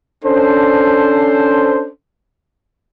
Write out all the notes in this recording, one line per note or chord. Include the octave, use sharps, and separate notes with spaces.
C#4 D4 A4 C5